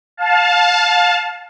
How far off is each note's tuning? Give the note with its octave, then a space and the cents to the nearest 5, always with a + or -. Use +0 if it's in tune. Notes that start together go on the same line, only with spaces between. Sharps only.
F5 +25 A5 -10